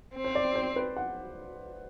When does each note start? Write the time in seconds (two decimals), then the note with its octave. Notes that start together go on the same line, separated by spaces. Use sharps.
0.15 C4
0.24 C5
0.35 D5
0.56 C5
0.76 B4
0.97 F#5